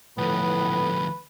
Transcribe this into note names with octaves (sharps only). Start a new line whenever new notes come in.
D2 A2 F3 B3 B4